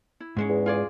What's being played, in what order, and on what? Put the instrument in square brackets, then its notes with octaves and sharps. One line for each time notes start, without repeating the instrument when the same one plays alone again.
[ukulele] E4
[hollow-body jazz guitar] G#2 G#3 C#4
[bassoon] E2
[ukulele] F4 G#4 D5